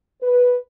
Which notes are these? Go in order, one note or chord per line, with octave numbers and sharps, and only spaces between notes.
B4